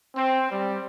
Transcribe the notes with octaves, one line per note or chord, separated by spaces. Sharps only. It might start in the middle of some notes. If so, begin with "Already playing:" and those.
C4
G3